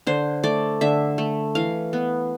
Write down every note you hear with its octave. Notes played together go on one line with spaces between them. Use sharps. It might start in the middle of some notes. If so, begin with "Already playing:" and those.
D3 C5
A3 D5
D3 E5
A3
E3 F5
B3